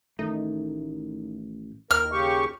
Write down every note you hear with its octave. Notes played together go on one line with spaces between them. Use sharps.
A1 D#3 A3 D#4
D#2 A#4 F6
C#3 G4 C#6